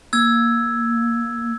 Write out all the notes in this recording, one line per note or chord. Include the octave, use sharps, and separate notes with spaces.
A#3 E6 G#6